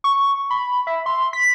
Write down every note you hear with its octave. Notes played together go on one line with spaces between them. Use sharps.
C#6
B5
E5
C6
B6